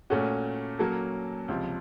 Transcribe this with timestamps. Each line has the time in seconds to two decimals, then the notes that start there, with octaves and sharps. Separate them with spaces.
0.10 A#2 A3 C#4 F#4
0.79 F#3 A#3 C#4 A4
1.48 C#2 C3 F3